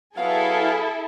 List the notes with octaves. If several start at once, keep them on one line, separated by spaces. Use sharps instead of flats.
F#3 B3 E4 G#4 A4 F5